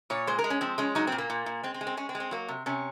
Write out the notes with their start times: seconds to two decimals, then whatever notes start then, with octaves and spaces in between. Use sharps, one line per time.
0.10 A#2 C#5
0.27 G#3 C5
0.39 A#4
0.44 G#3
0.50 C#4
0.61 F3 C4
0.78 G#3 C#4
0.95 F#3 D#4
1.07 A#2 C4
1.18 A#3
1.30 A#2
1.46 A#2
1.63 G#3 C4
1.74 C4
1.81 G#3
1.87 C4
1.97 G#3 C#4
2.09 C4
2.15 G#3
2.20 C4
2.31 F#3 A#3
2.48 C3
2.66 C3 C#4